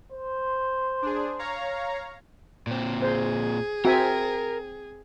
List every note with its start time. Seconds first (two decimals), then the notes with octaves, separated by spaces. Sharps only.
0.12 C5
1.02 D4 G#4
1.39 C#5 F5 A#5
2.67 A#2 C4
3.02 G#4 C5
3.85 C4 F#4 A#4 E5 G#5